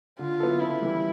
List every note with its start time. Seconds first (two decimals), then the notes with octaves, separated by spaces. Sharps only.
0.19 D3 F4
0.40 F#3 B3 E4 A4
0.61 C#3 E4
0.81 E3 G3